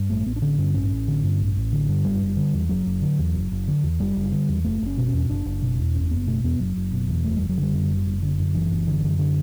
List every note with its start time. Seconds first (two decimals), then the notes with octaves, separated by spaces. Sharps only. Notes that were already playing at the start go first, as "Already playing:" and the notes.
Already playing: G2
0.10 A1 A3
0.26 A1 B3
0.36 D4
0.42 D3 C#4
0.58 G2 C#4
0.74 A1 C#4
0.91 A1
1.08 D3
1.24 G2
1.40 A1
1.56 A1
1.72 D3
1.89 G2
2.05 F#1 G3
2.21 F#1
2.37 D3
2.54 E2
2.69 F#1 F#3
2.86 F#1
3.02 D3
3.19 E2
3.35 F#1
3.51 F#1
3.68 D3
3.83 E2
4.00 F#1 G3
4.16 F#1
4.32 D3
4.48 E2
4.64 F#1 A3
4.82 F#1 C#4
4.98 B2
5.08 C#4
5.14 E2
5.29 F#1 D4
5.45 F#1
5.62 B2
5.78 E2
5.94 F#1 C#4
6.11 F#1 B3
6.27 B2 A3
6.44 E2 B3
6.59 F#1 F#3
6.76 F#1
6.92 B2
7.09 E2
7.24 F#1 A3
7.37 F#1 G3
7.49 F#3
7.57 D3
7.63 G3
7.74 F#2
7.89 F#1
8.05 F#1
8.22 D3
8.39 F#2
8.54 F#1 E3
8.70 F#1
8.87 D3
9.03 F#2
9.19 D3